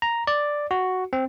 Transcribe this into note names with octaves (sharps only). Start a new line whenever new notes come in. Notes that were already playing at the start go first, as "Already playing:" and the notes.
A#5
D5
F#4
C4